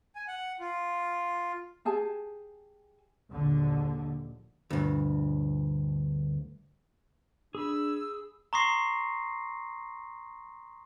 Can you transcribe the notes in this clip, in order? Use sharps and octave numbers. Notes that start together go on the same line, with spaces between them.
G#5
F#5
F4
G4 G#4 G#5 A5
A#1 D#2 D3
D2 G2
D4 G#4 B5 E6
A#5 C6 C#6 D#6 A#6 C7